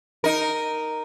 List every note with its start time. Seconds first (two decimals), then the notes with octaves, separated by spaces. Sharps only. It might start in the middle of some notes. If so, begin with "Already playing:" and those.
0.24 D#4 A#4